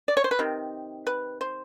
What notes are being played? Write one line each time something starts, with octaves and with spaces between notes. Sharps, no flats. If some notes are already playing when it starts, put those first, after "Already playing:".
D5
C#5
C5
B4
C3 D#3
B4
C5